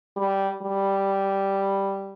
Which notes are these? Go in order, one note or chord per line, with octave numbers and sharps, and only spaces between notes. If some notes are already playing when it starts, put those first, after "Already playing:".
G3
G3